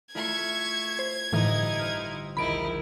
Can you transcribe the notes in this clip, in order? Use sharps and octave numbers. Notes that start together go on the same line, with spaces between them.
A3 E4 F4 E5 C#6 G#6
C5
G1 A2 D3 E3 D#4 E4
C5 D#5 F6
A#1 D#2 D#4 E4 B5 D7